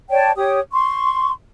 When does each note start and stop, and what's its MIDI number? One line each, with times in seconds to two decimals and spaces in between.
0.10 0.31 73
0.10 0.31 74
0.10 0.31 79
0.10 0.31 81
0.37 0.59 67
0.37 0.59 73
0.37 0.59 87
0.73 1.31 84
0.73 1.31 85